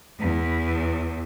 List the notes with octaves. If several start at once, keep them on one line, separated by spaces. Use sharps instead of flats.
E2